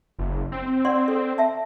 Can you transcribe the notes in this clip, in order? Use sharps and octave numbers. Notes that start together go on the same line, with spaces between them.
F#1
C4
D5 F#5 C6
A4
E5 G5 A5